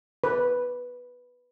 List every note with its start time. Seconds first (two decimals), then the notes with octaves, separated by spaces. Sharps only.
0.24 B4